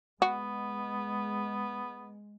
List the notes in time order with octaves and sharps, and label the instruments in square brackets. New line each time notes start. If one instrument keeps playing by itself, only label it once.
[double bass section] G#3 [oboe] B3 [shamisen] F#4